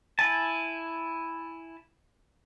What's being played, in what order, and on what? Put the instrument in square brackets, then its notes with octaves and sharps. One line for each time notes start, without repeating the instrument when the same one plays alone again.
[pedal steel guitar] E4 G#5 A5